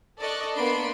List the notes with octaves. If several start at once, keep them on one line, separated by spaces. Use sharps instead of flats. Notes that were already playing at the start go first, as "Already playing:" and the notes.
A4 D5 D#5 C#6 F#6
A#3 B3 D4 B5 C6 D7